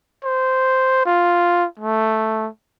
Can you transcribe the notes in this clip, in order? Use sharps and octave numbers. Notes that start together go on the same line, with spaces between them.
C5
F4
A3